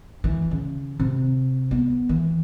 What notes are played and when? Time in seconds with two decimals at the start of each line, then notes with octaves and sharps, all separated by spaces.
0.24 E3
0.51 C#3
1.00 C3
1.71 B3
2.09 E3